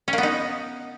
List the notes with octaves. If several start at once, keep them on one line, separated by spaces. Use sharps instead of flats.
C#4
A#3
B3
D#4